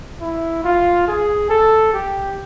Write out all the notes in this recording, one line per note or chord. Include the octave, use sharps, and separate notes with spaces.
E4
F4
G#4
A4
G4